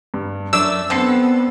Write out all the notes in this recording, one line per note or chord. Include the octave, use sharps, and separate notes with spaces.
G2
F#2 A3 D4 E6
D3 B3 C4 A4 C7